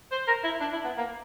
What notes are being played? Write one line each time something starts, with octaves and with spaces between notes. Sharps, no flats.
C5
A#4
E4
D4
E4
B3
A#3